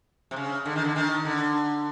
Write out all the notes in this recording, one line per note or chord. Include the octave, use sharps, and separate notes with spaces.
C3
C#3
D3
D#3
D3
D#3
D3